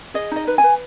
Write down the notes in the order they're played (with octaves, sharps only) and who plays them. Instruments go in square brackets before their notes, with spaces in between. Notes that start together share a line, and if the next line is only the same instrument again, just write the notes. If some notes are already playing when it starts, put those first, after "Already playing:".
[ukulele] G#4 D#5
D#4 D#5
B4
G#5
B4